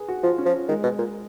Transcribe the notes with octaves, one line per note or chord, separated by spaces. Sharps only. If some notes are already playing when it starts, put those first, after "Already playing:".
Already playing: G#4 B4
F#4
F3 F4
C#4
F3
D#3 G#3
B2
A#2